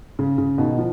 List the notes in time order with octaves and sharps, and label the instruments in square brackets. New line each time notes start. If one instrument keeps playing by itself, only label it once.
[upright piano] C#3
C#3
B2 D#3
F3